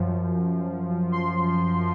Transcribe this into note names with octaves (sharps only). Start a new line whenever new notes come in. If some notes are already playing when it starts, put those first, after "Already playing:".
Already playing: F#2 F3
C6